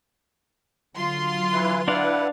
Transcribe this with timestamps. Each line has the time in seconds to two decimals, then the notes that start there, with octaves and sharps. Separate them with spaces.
0.95 D3 F#3 F4 C6
1.53 E3 E4 B4
1.88 D4 E4 B4 D5 F5 F#5